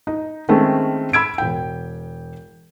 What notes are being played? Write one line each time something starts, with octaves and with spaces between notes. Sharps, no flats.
D#4
D#3 G#3 A3 C4 C#4
B5 E6 G#6 D7
E1 G5